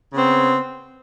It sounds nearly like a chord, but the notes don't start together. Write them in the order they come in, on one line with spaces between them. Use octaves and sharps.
C#3 B3 C4